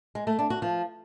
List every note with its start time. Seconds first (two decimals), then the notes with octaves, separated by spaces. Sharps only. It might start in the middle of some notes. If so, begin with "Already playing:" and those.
0.15 G#3
0.27 A3
0.39 D4
0.50 F#4
0.62 F3